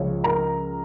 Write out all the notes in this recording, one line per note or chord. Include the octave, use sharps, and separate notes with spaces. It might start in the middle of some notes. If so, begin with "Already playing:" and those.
Already playing: C#2 C#3 F3 C#5
A#4 A#5